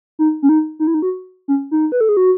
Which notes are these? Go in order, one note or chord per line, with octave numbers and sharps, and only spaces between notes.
D#4
C#4
D#4
D#4
E4
D#4
F#4
C#4
D#4
B4
A4
G#4
F#4